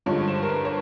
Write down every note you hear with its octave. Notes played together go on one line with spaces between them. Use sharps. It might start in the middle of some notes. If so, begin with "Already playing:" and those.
G2 D3 F3 G#3 C#5
C5
A#4
B4
C#5